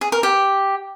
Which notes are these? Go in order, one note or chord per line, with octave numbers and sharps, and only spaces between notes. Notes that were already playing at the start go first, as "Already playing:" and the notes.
G#4
A#4
G4